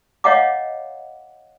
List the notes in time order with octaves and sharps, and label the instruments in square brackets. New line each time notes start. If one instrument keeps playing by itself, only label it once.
[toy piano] C#5 D#5 F5 F#5 A#5 D6